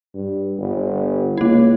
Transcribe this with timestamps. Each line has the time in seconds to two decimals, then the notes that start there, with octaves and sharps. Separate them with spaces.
0.14 G2
0.59 G1
1.37 C#2 A#3 E4